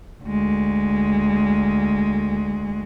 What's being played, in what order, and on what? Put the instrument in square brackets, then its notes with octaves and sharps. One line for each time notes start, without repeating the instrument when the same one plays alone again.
[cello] D2 G#3